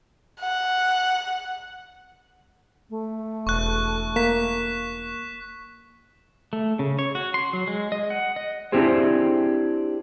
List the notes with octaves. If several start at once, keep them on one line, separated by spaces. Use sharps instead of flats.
F#5
A3
E1 C#6 F#6
A#3 B6 E7
A3
C#3
C#5
F#4
C6
F#3
G#3
D#5
F#5
D#5
C4 D4 E4 G4 G#4 C5